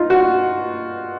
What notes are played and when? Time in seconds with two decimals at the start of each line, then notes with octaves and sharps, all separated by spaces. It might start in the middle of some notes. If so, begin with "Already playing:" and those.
Already playing: D#4 F4
0.10 F#4